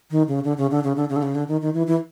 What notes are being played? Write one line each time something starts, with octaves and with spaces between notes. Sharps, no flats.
D#3
C#3
D3
C#3
D3
C#3
D3
C#3
D3
C#3
D3
D#3
D#3
E3
E3